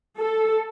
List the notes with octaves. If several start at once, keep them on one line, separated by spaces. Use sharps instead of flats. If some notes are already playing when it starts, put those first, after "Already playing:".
A4